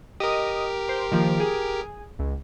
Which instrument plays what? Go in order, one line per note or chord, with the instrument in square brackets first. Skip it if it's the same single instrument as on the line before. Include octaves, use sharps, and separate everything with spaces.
[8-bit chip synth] G4 A#4 [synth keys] D#5 D#6
[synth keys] C5
D#3 F3 A#3
G#4
C#2